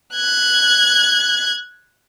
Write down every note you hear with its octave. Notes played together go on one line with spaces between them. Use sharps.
F#6 G#6